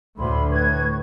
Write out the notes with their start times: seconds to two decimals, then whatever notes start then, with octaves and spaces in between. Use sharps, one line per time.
0.18 D2 A2 B5 C6
0.51 A2 B4 C#6 G#6